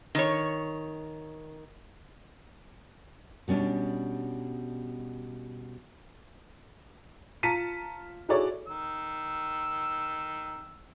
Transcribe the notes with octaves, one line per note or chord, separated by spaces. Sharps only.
D#3 C#5
B2 G3 C#4 D4
F4 A5 A#5 B6 C#7 D#7
E4 F#4 G#4 A4 C#5 D5
D#3 E6